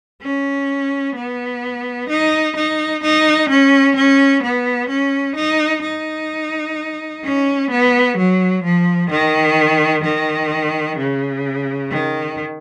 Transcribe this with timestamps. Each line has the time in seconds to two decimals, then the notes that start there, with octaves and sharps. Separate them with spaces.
0.22 C#4
1.16 B3
2.09 D#4
2.56 D#4
3.03 D#4
3.49 C#4
3.96 C#4
4.43 B3
4.89 C#4
5.36 D#4
5.83 D#4
7.24 C#4
7.71 B3
8.17 F#3
8.64 F3
9.10 D#3
10.04 D#3
10.98 C#3
11.91 D#3